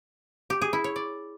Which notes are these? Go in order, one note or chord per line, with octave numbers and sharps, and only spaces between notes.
G4
G#4
E4
C#5
D5